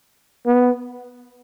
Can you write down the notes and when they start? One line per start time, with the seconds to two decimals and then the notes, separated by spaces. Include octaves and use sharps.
0.46 B3